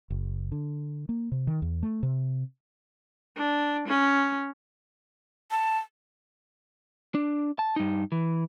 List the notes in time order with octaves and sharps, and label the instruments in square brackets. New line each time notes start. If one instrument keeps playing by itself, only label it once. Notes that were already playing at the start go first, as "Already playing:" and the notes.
[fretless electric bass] F#1
D3
A#3
C3
D#3
E2
A3
C3
[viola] D4
C#4
[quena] A5
[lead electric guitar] D4
A5
G2 D#4
E3